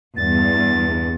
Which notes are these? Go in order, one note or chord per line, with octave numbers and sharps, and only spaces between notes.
E2 G2 A6